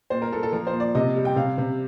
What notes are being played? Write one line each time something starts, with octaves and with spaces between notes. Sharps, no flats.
A#2 C5
A#4
A#2 A4
A4
F3 A#4
C5
A#2
D5
C3 D#5
G3
G5
C3 F5
C3